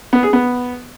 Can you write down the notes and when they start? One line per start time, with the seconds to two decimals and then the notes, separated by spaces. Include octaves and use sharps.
0.13 B3
0.23 G#4
0.33 B3